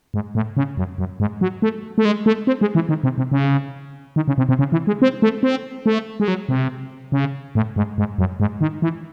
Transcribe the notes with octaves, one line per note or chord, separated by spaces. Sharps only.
G#2
A2
C#3
F#2
F#2
G#2
F#3
A3
A3
G#3
A3
C4
G#3
E3
D#3
C3
C3
C#3
D#3
C#3
C3
C3
C#3
E3
G#3
C4
A3
C4
A3
G#3
F#3
C3
C#3
A2
G#2
G#2
F#2
G#2
D#3
E3